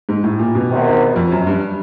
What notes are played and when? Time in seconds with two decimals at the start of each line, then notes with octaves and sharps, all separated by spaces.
0.09 G#2
0.24 A2
0.39 A#2
0.55 B2
0.70 E2 C3 D#3
1.16 F2
1.32 F#2
1.47 G2